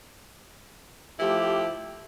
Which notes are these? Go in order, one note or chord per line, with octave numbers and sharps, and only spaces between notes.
F3 A3 E4 G4